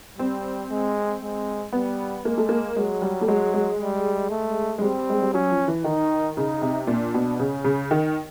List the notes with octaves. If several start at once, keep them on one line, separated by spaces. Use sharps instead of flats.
G3 C4
G#3
G#3
G3 B3
G#3 A#3
A3
A#3
F#3 G#3
G3
A3
F#3 G#3
G#3
G3
A3
G#3
G3 C4
G#3
G3
F#3 C#4
F3
E3
D#3 D#4
C#3 D#4
C3
A#2 D4
B2
C#3 C#4
C#3
D#3